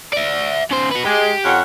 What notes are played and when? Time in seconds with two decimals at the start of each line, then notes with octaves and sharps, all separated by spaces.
0.13 D5 E5
0.71 C#3 C5
0.91 F#4 B4
1.05 G#3 G4
1.44 F2 C#4 F#5